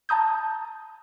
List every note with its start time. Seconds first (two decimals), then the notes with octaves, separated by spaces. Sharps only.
0.09 A5 A#5 D#6 G6